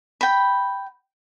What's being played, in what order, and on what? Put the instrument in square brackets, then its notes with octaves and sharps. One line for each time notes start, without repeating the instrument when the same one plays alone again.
[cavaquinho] G5 B5